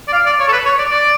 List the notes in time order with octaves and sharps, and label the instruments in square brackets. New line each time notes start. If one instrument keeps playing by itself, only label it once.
[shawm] D5
F5
D5
C#5
A4
B4
C#5
D5
D5